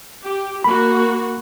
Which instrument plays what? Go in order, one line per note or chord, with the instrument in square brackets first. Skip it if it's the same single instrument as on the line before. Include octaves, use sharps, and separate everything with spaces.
[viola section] G4
[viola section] A#3 F#4 [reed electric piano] B5